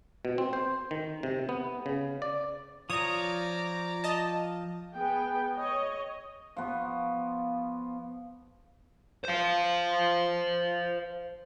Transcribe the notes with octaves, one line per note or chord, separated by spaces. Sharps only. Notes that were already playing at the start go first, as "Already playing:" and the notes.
B2
C4
C5
D#3
C3
B3
C#3
D5
F3 C#5 D5 A#5 D#6
D#5 A5
B3 G#4 G5
C#5 D#5
F3 B3 C#6
C5 F5